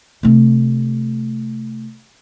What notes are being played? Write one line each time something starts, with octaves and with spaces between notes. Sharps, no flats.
C3 A3